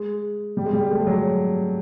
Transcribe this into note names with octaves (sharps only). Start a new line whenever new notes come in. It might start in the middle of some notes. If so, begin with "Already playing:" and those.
Already playing: G#3
G3
G#3
G3
G#3
A3
G#3
F#3